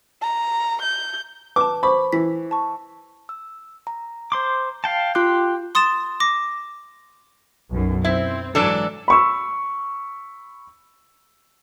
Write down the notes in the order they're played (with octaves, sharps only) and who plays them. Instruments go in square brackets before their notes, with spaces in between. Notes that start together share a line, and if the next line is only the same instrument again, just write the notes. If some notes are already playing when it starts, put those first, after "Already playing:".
[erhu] A#5
G6
[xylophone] B4 A5 [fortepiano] D6
[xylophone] C5 C#6 D6 [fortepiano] B5
[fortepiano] E3 [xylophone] B6
[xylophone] A5 C#6
[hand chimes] E6
A#5
[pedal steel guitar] C5 C6 D6
F5 G5 A5
[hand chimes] F4 D6 F#6 [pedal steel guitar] G4 G5 C6
[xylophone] C6 D#6 A6 E7
D6 A#6
[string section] B1 F#2
[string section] C4 [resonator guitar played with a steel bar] E4
[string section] G#2 F#3 D5 [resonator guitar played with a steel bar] E3 D4 A4
[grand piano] B5 C#6 E6